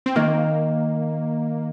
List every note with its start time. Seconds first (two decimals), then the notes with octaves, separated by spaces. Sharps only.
0.06 C4
0.16 D#3 A#3